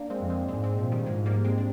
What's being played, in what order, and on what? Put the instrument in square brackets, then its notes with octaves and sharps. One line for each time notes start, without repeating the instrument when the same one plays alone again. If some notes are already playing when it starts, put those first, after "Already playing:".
Already playing: [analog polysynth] A#3 D4
G#3 C4
[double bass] F2
[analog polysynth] G#3 C4
[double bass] G#2 [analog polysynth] G#3 C4
[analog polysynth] G#3 C4
[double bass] A#2 [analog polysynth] F3
[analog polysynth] D#3 G3
[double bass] G#2 [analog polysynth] F3 G#3
[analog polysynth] G3 A#3
G#3 C4
D4